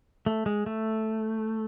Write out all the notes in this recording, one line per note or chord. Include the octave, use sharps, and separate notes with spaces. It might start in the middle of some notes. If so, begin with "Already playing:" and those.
A3
G#3
A3